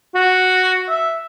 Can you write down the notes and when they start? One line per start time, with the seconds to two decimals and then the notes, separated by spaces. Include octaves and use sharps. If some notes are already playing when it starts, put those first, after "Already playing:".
0.15 F#4
0.89 E5